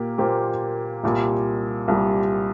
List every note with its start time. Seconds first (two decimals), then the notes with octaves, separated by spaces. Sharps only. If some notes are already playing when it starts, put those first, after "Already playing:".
Already playing: A#2 A#3 G4
0.18 A#2 A#3 G4 C5
1.04 C2 A#2 G3
1.88 C2 A#2 G3